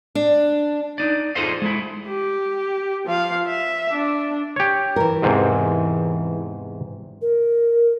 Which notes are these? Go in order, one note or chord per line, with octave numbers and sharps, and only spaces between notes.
D4
D#4 D5
F4 G#4 A4 C5 D#5 F5
G#3 E4
G4
F3 F5
E5
D4
G4 C#5
E3 A#4
E2 G#2 C3
A#4